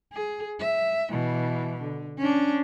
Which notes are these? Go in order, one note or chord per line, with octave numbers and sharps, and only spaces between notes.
G#4
E5
B2 E3
D3
C#4 D4